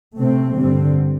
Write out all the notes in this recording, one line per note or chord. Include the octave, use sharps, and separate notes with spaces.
C3 A3 C4
G2 D3 G3 C4